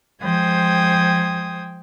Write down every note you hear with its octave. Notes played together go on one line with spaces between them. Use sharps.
F3 G#3 C5 G5 D#6 G#6